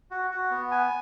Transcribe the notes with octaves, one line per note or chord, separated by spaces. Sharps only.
F#4
F#4
B3
G#5